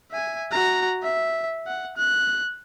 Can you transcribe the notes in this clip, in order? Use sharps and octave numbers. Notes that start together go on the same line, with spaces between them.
E5 G#5
F#4 A#5
E5
F#5
F#6